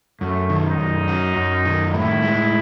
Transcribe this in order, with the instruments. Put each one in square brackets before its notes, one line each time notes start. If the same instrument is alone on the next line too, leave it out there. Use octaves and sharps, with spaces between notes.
[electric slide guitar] F#2 [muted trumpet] A3
[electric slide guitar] D#3
[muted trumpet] D#4
[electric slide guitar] F#2
F#3
F#2
D#3
[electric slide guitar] A2 [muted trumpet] E4
[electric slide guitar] G#3